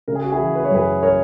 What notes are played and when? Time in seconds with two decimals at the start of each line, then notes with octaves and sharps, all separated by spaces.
0.08 C#3 A#4
0.15 G#4
0.24 F#4
0.32 E4 G#4
0.39 E3
0.55 B4
0.65 C#5
0.71 F#2 G#4 B4
1.03 C#3 A#4 C#5